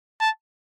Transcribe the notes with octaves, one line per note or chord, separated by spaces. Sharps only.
A5